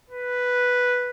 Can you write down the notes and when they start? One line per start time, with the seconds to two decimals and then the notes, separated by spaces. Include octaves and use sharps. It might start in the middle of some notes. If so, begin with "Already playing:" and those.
0.10 B4